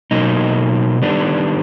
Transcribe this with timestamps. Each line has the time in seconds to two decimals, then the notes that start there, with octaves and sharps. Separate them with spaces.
0.11 B2 F#3 A#3 D#4
1.02 D#3 G3 B3 D4